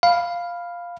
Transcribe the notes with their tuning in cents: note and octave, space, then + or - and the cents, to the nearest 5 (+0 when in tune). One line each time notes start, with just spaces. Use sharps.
F5 +0 B5 +0